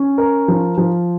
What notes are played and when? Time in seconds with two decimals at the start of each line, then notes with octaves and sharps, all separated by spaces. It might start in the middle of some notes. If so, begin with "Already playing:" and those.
Already playing: C#4
0.18 A#4
0.48 F3
0.77 F3